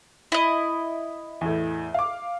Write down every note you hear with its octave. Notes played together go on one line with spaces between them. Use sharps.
E4 D#5
E2 A2
F5 D6